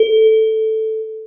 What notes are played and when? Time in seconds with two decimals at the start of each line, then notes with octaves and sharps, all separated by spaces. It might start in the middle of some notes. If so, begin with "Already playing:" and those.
Already playing: A4